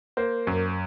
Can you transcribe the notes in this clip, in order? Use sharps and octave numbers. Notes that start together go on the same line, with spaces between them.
A#3 C5
F#2